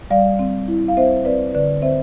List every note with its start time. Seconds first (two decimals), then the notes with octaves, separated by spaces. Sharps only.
0.11 G3 D5 F5
0.39 C4
0.68 E4
0.88 F5
0.97 C4 C5 E5
1.25 C4 B4 D5
1.54 D3 B4 D5
1.82 C4 C5 E5